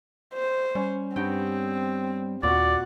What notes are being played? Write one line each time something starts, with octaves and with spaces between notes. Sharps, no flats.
C5
G3 C#4
G2 B3 C4 G5
D#2 A#2 F#4 D5 F#5